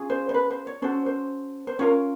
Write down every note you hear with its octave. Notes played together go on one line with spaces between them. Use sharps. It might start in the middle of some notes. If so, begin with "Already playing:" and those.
Already playing: C#4 F4 G#4
C5
C5
B4
C5
C#5
C#4 F#4 A4 C5
C5
C5
C#4 F4 A#4 C#5